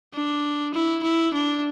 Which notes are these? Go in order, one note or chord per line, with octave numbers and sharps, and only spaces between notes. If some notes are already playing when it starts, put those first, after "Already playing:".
D4
E4
E4
D4